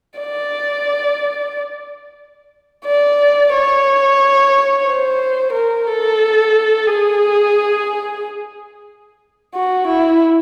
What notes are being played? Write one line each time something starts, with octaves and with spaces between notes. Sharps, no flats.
D5
D5
C#5
C5
A#4
A4
G#4
F#4
E4